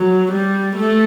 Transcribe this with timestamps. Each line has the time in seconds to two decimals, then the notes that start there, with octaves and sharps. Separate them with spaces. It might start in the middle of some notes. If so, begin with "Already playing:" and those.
Already playing: F#3
0.32 G3
0.76 A3